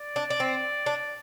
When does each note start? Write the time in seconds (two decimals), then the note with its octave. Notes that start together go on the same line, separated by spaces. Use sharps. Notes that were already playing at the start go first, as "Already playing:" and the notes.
Already playing: D5
0.16 D4
0.30 D4
0.40 C4
0.86 D4